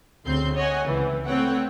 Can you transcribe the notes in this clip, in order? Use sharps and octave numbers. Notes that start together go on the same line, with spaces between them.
D2 C#3 C4 C6 G6
C#5 D#5 F#5 G#5
C#2 E3 C4
A3 B3 C4 C#5 F#5 G5